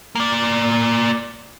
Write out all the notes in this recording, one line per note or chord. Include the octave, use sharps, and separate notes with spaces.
A#3 D5